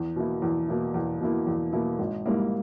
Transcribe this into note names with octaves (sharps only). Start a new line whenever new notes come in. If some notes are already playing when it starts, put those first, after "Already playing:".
Already playing: E2
B2 A#3 E4
E2
B2 A#3 E4
E2
B2 A#3 E4
E2
B2 A#3 E4
G#1
G#2 G3 A#3 E4